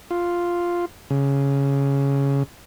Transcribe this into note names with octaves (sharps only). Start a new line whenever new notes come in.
F4
C#3